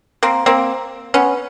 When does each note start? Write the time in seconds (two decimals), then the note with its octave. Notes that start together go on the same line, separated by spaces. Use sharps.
0.23 A#3 C4
0.46 A#3 C4
1.14 B3 C#4